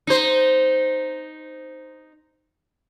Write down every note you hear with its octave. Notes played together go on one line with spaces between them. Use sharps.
D#4 C5